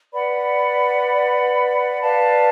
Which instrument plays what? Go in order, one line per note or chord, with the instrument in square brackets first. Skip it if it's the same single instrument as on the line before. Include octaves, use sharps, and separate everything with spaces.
[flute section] B4 D5 F#5 B5
B4 D5 F5 A5